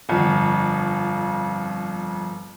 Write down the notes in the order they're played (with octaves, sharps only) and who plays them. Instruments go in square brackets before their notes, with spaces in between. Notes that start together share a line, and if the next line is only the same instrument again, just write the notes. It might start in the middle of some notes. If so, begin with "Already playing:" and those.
[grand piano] G1 F2